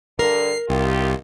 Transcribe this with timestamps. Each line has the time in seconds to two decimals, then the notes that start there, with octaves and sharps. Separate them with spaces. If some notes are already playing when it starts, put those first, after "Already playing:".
0.19 G2 D3 A#4 C7
0.69 C2 D#3 F4 G4